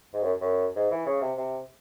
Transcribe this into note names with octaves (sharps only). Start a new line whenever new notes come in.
G#2
F#2
F#2
G#2
E3
C#3
C3
C3